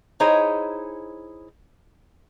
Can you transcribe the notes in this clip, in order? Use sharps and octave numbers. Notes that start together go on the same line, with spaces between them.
D#4 E4 G#4 C5 C#5 D#5